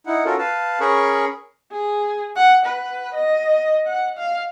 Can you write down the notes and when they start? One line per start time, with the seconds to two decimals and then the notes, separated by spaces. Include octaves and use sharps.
0.06 D#4 E4 F#5
0.25 C#4 F4 F#4 A4 A#4
0.38 B4 F5 A5
0.80 C#4 G#4 A#4 B5 C#6
1.72 G#4
2.36 F#5
2.65 B4
3.15 D#5
3.87 F#5
4.18 F5